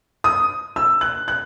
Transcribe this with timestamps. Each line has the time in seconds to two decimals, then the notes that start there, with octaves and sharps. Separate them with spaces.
0.24 D#6
0.76 E6
1.01 F#6
1.28 F#6